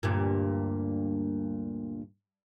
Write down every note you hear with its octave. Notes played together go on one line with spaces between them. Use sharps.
D2 G2 A#2